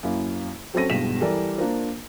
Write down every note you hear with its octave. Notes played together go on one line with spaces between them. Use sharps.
F#2 A#3 E4
F#3 C4 C#4 A4 A#6 D#7
E1 B1 G2 B2 B6 E7
E3 G3 A4 A#4 D5
A#3 D4 F4 A#4 C5